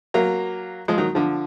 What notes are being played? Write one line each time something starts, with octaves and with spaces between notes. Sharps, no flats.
F#3 A#3
F3 G#3
D#3 F#3
D3 F3